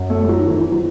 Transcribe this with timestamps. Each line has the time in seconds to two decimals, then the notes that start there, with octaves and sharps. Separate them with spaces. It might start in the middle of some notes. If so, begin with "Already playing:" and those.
Already playing: F#2
0.10 A3
0.23 G#3
0.29 F#3
0.39 D#3
0.47 G#2 E3
0.57 E3
0.72 F#3